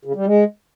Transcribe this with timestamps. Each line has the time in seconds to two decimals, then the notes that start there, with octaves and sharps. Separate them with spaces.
0.05 C#3
0.16 G3
0.26 G#3